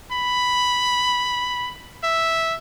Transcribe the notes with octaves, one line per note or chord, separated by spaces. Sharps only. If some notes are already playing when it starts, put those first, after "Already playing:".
B5
E5